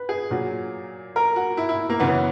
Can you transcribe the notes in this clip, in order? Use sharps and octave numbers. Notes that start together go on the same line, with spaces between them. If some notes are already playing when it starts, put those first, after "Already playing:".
Already playing: B4
G#4
A#2 F#3
A#4
F#4
E4
E4
A#3
F#2 C#3 E3 B3